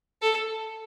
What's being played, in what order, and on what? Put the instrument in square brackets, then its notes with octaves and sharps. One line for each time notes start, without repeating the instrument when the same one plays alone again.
[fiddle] A4